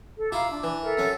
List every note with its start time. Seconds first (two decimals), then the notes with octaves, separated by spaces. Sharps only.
0.17 A4
0.32 E4 F4 F5 A#5 D6
0.49 D4 D6
0.63 E3
0.82 A4 A#4 E5
0.97 F#2 C#4